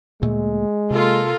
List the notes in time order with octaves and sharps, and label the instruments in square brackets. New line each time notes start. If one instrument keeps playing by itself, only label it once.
[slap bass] D2 A#2 A3 [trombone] G#3
[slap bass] C3 [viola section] A#3 F4 A4